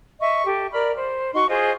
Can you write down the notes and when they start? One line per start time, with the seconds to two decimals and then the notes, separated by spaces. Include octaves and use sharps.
0.20 D#5 E5 C#6
0.46 G4 A4
0.73 A#4 D5 B5 F6
0.95 C5
1.34 D#4 F#4 C6 C#6
1.49 F4 G#4 C5 D#5